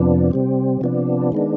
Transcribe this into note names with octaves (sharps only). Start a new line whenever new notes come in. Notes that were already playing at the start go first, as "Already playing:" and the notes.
Already playing: F2 C3 F3 B3 D4
C3 G3 C4
C3 F3 B3 D4
D#3 G#3 B3 D4